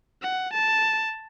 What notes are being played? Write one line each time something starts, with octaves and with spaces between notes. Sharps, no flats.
F#5
A5